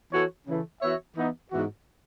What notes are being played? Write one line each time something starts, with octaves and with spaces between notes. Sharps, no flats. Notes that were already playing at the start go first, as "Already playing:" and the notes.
E3 B3 F#4 A4 C#5
C#3 E3 A3
E3 B3 F#4 C#5 E5
E3 B3 D#4
G#2 E3 B3 F#4